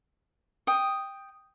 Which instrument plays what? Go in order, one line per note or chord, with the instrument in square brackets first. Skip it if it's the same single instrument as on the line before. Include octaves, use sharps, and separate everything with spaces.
[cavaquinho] G5 D#6